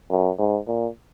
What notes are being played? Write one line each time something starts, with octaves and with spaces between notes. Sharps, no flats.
F#2
G#2
A#2